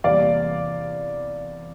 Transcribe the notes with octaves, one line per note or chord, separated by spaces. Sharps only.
E2 C3 G3 A#3 D5 F5